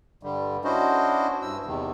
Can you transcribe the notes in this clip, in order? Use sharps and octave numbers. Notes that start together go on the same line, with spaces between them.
G2 D3 G3
C#4 D4 E4 F#4 C5 D#5
G2 E6
E2 C3 D#3